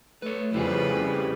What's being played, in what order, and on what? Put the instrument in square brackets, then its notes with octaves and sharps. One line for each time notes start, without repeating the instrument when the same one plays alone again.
[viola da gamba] A3 [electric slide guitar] B4 C#5
[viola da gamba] F2 F3 B4 [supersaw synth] C#3 G3 [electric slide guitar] E4 F4 G#4